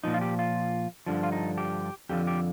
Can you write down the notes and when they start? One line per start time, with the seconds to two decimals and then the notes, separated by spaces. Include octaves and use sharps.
0.04 A#2 F3 D#4
0.14 F4
0.21 G4
0.39 F4
1.06 G2 D3 F3
1.23 F4
1.32 D#4
1.58 G4
2.09 F2 D3 F3 G4
2.27 G4